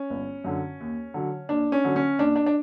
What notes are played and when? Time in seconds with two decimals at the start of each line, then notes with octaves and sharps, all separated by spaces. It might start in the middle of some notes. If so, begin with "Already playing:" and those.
Already playing: C#4
0.10 G1
0.44 F#2 D3 F#3
0.80 D#2
1.14 D3 F#3
1.49 D#2 D4
1.72 C#4
1.84 D3 F#3
1.96 C#4
2.19 D#2 D4
2.36 D4
2.46 D4